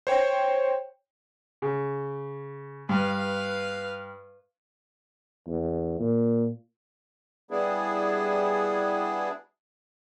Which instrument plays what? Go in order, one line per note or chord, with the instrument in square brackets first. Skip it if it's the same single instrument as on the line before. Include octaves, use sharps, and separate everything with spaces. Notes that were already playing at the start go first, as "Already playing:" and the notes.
[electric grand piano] C5 C#5 G5
[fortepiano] C#3
[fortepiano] G2 [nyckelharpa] B4 F5
[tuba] E2
A#2
[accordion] G3 B3 D4 E4 G#4